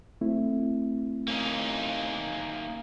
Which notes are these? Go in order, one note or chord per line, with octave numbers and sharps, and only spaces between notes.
A3 C4 E4
A#3 C#4 D#4